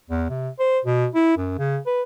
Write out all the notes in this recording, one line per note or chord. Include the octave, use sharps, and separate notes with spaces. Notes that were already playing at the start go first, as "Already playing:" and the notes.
E2
C3
C5
B2
E4
F#2
C#3
B4